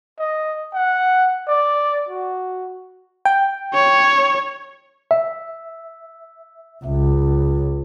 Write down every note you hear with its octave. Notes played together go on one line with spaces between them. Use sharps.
D#5
F#5
D5
F#4
G5
C#5
E5
C#2